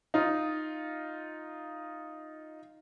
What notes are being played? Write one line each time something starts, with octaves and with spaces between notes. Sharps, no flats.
D#4 F4